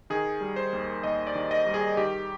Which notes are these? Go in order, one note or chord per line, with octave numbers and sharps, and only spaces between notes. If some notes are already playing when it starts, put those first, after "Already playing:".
D#3 G#4
G3
C5
D#2
D#2 D#5
D5
D#3
D#5
G3
G#4
D#3 G4